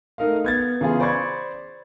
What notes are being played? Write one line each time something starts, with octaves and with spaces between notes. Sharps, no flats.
A3 D#4 A#4 D#5 F5
B3 G#6 A6
C#3 E3 B3 F4 G#4
C5 D5 B5 C#6 G#6